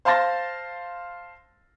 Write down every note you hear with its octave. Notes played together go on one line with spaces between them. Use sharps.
C5 F5 A5 C6 A6 A#6